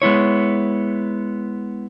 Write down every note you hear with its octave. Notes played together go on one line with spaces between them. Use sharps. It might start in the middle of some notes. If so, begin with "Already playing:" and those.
G#3 B3 E4 C#5